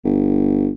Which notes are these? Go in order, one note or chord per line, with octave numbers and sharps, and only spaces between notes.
G1